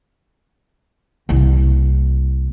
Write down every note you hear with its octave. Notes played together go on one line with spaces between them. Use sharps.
C2 A#3